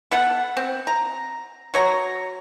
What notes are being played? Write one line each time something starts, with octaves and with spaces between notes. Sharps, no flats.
B3 A4 F#5
C4
A#5
F#3 C#5 A#5